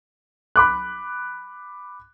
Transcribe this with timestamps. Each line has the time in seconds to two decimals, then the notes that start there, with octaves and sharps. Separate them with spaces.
0.56 B5 D6 F#6